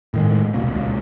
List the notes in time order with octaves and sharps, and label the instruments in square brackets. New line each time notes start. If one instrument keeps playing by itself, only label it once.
[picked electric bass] A2 D#3 G#3
D#1 C2 B2 A#3
C#2 A#2